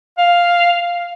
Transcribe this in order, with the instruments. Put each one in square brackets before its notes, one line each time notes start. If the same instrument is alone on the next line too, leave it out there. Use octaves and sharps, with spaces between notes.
[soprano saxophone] F5